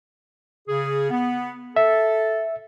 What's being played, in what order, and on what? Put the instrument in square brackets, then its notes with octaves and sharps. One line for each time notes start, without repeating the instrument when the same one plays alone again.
[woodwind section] C#3 G#4
B3
[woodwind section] A4 [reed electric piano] E5